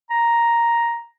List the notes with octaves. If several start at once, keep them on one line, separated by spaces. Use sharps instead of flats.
A#5